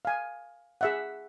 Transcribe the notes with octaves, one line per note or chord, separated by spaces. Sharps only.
F5 G#5
G#4 E5 F#5